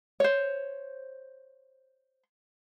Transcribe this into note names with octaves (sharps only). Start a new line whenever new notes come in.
C5 C#5